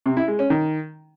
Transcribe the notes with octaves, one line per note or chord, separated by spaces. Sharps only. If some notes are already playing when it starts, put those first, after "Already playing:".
C3
E4
G#3
C#4
D#3